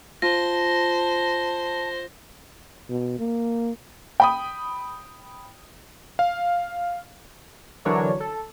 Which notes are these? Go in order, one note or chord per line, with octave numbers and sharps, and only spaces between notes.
F4 C5 A5 A#6
B2
A#3
G5 B5 D#6
F5
D3 E3 F#3 D4 A#4 C#5
A4